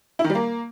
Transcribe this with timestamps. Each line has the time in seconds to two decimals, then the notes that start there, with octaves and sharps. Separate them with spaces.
0.19 E4
0.24 D#3
0.30 G3
0.35 A#3